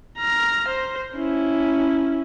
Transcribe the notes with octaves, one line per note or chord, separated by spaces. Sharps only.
A#5 F6
C5
C#4 E4